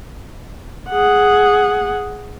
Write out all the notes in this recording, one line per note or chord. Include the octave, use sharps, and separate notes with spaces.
G#4 F#5